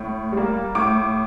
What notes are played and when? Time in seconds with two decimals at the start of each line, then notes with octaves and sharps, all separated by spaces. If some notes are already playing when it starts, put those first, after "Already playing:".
Already playing: A2
0.32 G3 A#3
0.75 A2 D6